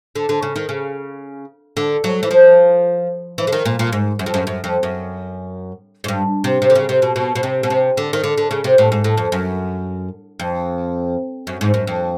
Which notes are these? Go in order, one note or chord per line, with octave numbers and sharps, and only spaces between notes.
D3
D3
C#3
D#3
C#3
D3
F#3
E3
F3
E3
D3
D#3
A#2
A#2
G#2
F#2
F2
F#2
F#2
F2
F#2
G#2
G2
C3
C3
D3
C#3
C3
B2
B2
B2
C3
B2
C3
D3
D#3
D3
D3
C#3
C3
A2
G#2
A2
F2
F#2
F2
F#2
G#2
F#2
F2